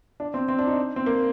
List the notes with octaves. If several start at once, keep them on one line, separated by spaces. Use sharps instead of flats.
D4
C4
C4
D4
D#4
C4
A#3